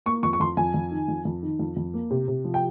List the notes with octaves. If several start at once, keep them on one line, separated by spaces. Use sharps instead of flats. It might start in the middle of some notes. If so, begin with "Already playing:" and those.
A#3 C#6
F2 C#6
C#6
F2 C6
F2 G#5
F2
D#3
F2
F2
D#3
F2
F2
A#3
C3
C3
F3
G5